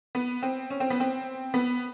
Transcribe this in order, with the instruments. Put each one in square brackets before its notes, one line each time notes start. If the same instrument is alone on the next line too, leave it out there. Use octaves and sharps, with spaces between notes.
[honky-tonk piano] B3
C4
C#4
C4
B3
C4
B3